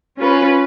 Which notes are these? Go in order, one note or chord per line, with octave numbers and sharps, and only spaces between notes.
C#4 F4 B4